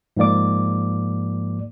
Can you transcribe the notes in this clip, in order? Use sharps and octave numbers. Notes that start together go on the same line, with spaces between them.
G#2 F3 A#3 D5 D6